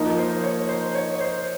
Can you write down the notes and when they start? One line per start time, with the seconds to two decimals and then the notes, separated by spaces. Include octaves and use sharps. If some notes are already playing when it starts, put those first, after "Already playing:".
Already playing: F3 A#3 D#4
0.19 C5
0.44 C#5
0.69 C5
0.95 C#5
1.21 C5